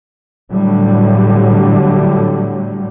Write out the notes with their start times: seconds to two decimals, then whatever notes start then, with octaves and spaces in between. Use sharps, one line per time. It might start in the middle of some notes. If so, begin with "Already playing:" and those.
0.53 A2 D3 F#3 G3